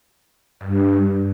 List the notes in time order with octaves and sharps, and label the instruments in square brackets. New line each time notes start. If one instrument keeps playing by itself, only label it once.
[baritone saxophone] G2